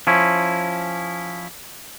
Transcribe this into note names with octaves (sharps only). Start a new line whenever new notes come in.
F3 C#4 E4